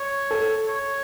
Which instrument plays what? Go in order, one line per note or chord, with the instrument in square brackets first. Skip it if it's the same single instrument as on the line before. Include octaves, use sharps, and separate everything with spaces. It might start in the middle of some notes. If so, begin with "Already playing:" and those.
Already playing: [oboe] C#5
[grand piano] A4
[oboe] C#5